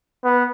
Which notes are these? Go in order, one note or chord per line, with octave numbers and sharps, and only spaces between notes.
B3